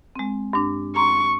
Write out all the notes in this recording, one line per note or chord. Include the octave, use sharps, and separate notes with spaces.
G#3 C4
G2 D4
A#5 C6 C#6